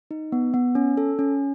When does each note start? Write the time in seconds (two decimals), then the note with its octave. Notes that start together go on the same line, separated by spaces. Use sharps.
0.11 D#4
0.32 B3
0.54 B3
0.75 C#4
0.97 A4
1.19 C#4